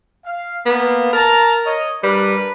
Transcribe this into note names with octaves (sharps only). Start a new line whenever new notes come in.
F5
A#3 B3
A#4 A5 A#5
C#5 D#5
G3 D4 A#4 B4